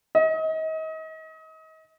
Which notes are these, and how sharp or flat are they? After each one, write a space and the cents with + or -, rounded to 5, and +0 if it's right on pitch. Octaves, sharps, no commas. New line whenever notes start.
D#5 +35